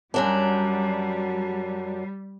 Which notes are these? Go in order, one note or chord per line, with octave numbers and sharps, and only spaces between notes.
F#2 F#3 G3 D4